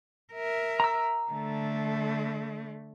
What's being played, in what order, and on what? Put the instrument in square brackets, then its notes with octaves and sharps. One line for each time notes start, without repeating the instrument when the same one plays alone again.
[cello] A#4 E5
[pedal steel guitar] A#5 E6
[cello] D3 A3